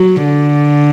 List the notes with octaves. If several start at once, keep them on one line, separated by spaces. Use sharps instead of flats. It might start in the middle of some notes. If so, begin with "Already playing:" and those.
Already playing: F#3
D3